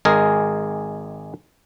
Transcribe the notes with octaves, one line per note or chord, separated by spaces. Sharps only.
G#1 G#3 G#4 A#4